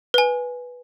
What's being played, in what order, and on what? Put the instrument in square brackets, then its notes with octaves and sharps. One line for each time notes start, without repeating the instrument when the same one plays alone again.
[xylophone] B4 G#5